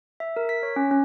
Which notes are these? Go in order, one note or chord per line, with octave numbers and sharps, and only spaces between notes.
E5
A#4
B6
C#5
C#4
C#4